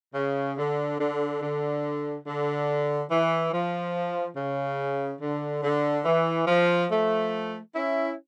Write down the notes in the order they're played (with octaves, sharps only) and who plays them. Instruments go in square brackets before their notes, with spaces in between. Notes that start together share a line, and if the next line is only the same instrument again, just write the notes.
[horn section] C#3
D3
D3
D3
D3
E3
F3
C#3
D3
D3
E3
F3
F3 A3
C#4 E4